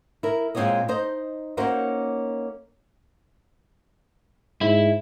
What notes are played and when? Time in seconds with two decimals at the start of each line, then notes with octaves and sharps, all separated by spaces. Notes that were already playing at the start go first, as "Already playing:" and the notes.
0.23 E4 A#4
0.55 A#2 G#3 C4 D#4 C#5 D#5
0.88 D#4 C5 D#5
1.57 A#3 C#4 D#4 F#4 A#4 C5
4.61 G#2 E4